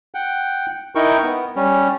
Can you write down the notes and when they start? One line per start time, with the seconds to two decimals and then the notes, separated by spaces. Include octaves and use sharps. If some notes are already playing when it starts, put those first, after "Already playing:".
0.15 F#5 G5
0.95 D#4 E4 A#4 G5 C#6
1.23 B3
1.56 G3 C#4